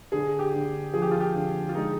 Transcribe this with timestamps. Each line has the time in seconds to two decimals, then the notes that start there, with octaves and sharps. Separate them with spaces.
0.12 D3 G#4
0.39 G4
0.53 D3
0.94 F3 G#4
1.02 G4
1.11 F4
1.20 G4
1.35 D3
1.69 F4
1.75 G#3 D#4